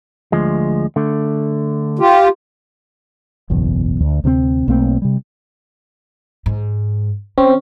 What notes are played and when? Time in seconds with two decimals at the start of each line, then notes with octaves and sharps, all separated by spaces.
0.32 D2 F3 G#3
0.96 D3 A3
1.99 F4 G4
3.50 F#1 B1 E2
4.01 D2
4.24 D2 C3 G3 C4
4.68 B1 A3 A#3 C4
5.02 C3 G3
6.46 G#2
7.38 D#3 C4 C#4